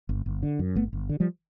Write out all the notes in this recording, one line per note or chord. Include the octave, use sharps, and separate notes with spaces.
G1
G1
D3
F#2
G1 A3 B3
G1
D3
F3 G3